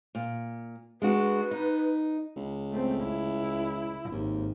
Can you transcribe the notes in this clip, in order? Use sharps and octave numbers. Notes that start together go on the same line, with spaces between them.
A#2
G#3 D4 F#4 B4
D#4
C#2
A3 C4
E4
G#1 D#2